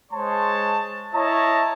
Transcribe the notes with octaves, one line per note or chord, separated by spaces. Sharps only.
G#3 C5 C#5 A5 C6
E4 C#5 D#5 A5 A#5